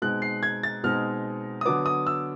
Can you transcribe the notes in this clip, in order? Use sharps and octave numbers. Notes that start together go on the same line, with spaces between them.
B2 G#3 C4 D#4 F#6
C7
G#6
A6
B2 G#3 C4 D#4 F6
D#6
D3 F#3 B3 D6
D#6
E6